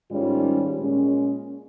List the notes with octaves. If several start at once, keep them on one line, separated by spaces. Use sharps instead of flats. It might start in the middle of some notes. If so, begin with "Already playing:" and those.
G#2 D#3 G3 C#4 F4
A#2 G#3 C#4